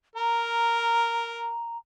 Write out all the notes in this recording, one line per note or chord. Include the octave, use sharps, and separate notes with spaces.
A#4 A#5